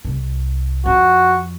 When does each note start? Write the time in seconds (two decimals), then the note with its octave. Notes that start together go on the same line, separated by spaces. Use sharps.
0.05 C2
0.86 F2 F#4